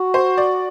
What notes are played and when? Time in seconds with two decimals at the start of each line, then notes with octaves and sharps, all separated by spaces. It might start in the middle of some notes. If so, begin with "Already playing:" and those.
Already playing: F#4
0.14 C5
0.38 D5